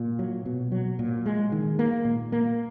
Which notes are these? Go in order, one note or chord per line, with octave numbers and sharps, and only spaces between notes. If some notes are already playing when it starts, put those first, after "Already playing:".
Already playing: A#2
F#3
B2
F#3
A#2
G#3
D#3
A#3
A#2
A#3